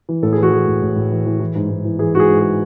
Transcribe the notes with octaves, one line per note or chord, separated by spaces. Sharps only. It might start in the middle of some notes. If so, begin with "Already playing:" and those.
E3
A2 A4
G#4
E3
F#4
E3 G#4
A2
A2
A2
E3
E3
E3
G#2
G#2
E3
E3 G#4
G#2 F#4
G#4
G#2
G#4